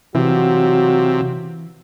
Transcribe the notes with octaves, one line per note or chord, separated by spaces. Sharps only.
C3 E3 F#3 F4 F#4